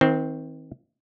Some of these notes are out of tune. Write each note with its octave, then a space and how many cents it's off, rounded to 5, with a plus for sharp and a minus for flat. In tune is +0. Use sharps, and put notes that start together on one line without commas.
D#3 +35 C4 +0